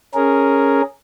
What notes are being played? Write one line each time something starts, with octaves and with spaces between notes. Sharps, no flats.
C#4 G#4 A#4